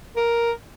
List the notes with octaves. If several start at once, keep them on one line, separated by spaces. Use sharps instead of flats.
A#4